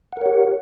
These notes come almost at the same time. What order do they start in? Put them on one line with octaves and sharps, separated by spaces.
F#5 A#4 C#5 G4